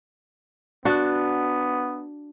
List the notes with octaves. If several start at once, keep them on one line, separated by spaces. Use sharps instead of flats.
B3 D4 F#4